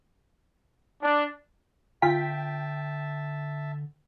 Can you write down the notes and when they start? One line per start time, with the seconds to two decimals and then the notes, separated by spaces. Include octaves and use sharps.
1.01 D4
2.02 D3 F4 E5 G5 A5 B6